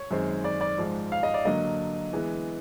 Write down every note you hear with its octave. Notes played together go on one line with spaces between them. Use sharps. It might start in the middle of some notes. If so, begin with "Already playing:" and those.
Already playing: C#5
F#2 D#3 G#3 C4
D5
D5
G#2 F3 G#3
F5
D#5
D5
D3 F#3 A#3 D4 D#5
E3 G#3 B3